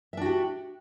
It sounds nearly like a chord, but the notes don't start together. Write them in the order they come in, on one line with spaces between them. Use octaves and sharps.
E5 D4 F#4 G4